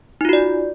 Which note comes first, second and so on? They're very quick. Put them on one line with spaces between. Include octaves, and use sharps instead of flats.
D#4 F4 F#4 D5